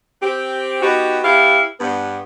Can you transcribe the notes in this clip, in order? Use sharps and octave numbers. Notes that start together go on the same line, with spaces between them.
C4 G4
B3 D#4 F#4 G4
B3 E4 G4 F5
G2 B3